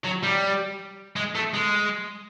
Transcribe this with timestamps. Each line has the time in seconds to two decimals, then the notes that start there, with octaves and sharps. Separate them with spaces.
0.04 F#3
0.23 G3
1.16 G#3
1.35 A3
1.54 G#3